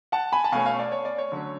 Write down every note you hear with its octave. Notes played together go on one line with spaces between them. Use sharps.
F#5 A5
G#5 B5
A5
B2 A3 C#4 F5 G#5
C#5 F5
D5
C#5
D5
C#5
D3 F#3 A3 C#4